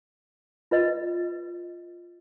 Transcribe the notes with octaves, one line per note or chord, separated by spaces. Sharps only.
F4 B4 D#5